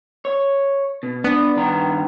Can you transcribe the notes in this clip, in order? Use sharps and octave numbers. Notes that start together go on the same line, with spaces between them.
C#5
B2
B3 D4
G2 D#3 A#5